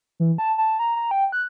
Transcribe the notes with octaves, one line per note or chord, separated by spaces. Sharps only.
E3
A5
A5
A#5
A#5
G5
F#6